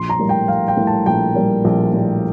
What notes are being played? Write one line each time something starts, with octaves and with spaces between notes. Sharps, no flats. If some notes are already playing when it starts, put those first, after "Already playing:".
Already playing: A#1 C6
A#5
A2 G3 A#3
G5
A#1 F5
G5
A2 G3 A#3
A5
A#1 G5
A2 G3 A#3
A#1
A2 G3 A#3